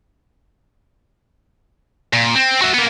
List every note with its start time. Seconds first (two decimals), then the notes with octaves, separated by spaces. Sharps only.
2.13 A#2
2.35 C4
2.62 F#4 E5
2.74 A#3 B3